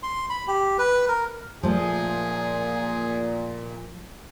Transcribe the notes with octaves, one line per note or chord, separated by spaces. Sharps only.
C6
B5
G4
B4
A#4
A#2 F3 A3 G#4